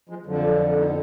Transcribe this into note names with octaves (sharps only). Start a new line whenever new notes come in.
F3 G#3
F2 D3 F3 F#3
F#3
F3
B3 D#4